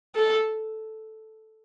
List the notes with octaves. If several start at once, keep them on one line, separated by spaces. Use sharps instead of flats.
A4